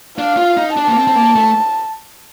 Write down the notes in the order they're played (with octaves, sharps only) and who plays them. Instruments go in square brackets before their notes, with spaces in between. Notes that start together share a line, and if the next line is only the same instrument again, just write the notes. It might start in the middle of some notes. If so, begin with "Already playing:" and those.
[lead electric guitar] D4 [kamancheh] F5
[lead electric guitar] F4
D#4
[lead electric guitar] D4 [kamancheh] A5
[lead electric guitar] A#3
C4
C4
A#3
A3